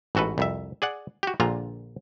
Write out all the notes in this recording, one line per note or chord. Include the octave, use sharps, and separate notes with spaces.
A1 G#2 F#4 A4 B4
C2 F2 E5
G#4 D5 F#5
F#4 G4
A#1 A#2 D3 F4 A#5